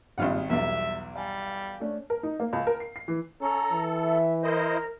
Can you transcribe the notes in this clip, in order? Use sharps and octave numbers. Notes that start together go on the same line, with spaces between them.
G#1 A#2 C#3 G3 F5 F#5
B1 E2 G3 E5
G3 F5 G#5
A3 C#4 D4
A#4
D#4
A#3
C#2
A#4
C7
C7
E3
C#4 A4 A#5
E3
E5
E4 A#4 C5 D#5